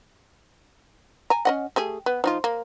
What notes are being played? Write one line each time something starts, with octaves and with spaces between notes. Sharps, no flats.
G#5 A#5
C#4 D#5 F#5
A3 G4 G#4
B3
F3 D#4 F4
A#3